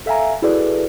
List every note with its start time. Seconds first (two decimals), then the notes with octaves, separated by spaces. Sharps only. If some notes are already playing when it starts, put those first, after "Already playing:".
0.06 A4 E5 F5 G#5 A#5
0.42 E4 F#4 G#4 A4 B4 D5